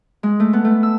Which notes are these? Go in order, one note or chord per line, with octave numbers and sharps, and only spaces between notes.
G#3
A3
B3
A3
E6